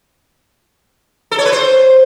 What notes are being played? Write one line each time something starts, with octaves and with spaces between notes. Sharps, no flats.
A4
C#5
B4
C5